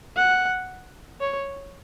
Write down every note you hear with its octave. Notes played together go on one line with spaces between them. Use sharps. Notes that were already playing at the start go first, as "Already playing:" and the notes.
F#5
C#5